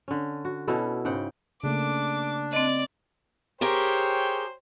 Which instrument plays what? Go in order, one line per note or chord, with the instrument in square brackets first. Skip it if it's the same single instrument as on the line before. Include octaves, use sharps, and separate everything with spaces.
[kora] D3 C#4
F#4
B2 C#4 E4 A4
G#2 C#3 F#5 G5
[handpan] C#3 A3 A#3 [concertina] D4 [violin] D6
[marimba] C4 D#5 [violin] D5
[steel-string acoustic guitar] G4 G#4 A#4 [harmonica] C5 C#5 G5